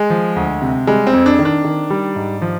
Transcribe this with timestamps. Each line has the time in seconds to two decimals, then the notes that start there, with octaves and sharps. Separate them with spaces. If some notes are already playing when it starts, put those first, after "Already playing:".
Already playing: G#3
0.10 F3
0.36 D2
0.62 C3
0.87 G3 G#3
1.07 C4
1.13 F2
1.26 D4
1.39 D#3
1.45 D4
1.64 D#3
1.90 G3
2.16 G#2
2.42 F3